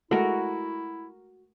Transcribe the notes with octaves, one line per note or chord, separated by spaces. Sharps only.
G#3 A3 E4 F#4 A4 A#4